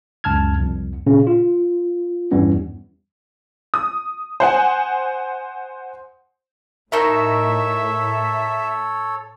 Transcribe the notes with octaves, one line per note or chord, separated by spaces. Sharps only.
C#2 F#2 A5 F6 G#6
C2 F2
A#2 C#3 C#4
F4
E2 G2 E3 G3 B3 C#4
D#6
C5 F#5 G#5
A2 D#4 F#4 A4 A#4 C#5 E5